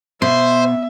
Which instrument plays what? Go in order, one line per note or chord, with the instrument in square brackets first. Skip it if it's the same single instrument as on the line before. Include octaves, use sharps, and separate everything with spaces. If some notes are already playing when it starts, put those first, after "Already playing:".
[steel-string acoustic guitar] B2 [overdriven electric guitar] C5 [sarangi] E5